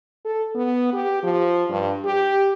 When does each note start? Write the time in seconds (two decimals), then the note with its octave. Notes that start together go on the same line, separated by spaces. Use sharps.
0.25 A4
0.55 B3
0.93 G4
1.23 F3
1.70 G2
2.05 G4